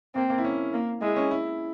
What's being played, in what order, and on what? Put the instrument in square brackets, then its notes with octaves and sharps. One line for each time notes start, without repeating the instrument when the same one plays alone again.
[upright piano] A#3 [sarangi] C4
[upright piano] A#3
E4
C#4
[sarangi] A#3
[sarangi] G#3 [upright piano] E4
[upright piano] C#4
E4